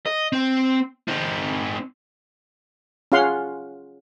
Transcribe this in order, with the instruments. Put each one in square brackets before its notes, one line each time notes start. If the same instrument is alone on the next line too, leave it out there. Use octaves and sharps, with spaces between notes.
[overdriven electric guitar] D#5
C4
C4 D#4
[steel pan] C#4 F4 G#4 F5 F#5 C6